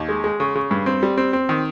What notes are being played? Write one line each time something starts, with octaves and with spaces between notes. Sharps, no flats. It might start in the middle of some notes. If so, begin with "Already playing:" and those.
Already playing: D#2
G#3
G#3
C#3
C#3
G2
C4
G3
C4
C4
D#3